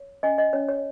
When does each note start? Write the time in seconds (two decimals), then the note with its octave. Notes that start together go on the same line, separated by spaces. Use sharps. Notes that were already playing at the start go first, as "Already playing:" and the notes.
Already playing: C#5
0.23 C#4 D#5 G#5
0.38 D#5
0.53 C#4 C#5
0.69 C#5